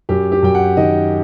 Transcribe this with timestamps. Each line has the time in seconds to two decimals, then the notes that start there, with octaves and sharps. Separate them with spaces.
0.09 F#2 G4
0.32 G4
0.43 F#2 G5
0.55 F#5
0.77 D#3 D#5